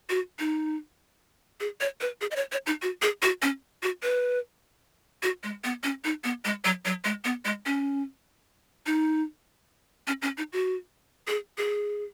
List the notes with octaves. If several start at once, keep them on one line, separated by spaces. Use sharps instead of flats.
F#4
D#4
G#4
C#5
B4
G#4
D#5
C#5
C#5
D#4
F#4
G#4
F#4
C#4
F#4
B4
F#4
G#3
B3
C#4
D#4
B3
G#3
F#3
F#3
G#3
B3
G#3
C#4
D#4
C#4
C#4
D#4
F#4
G#4
G#4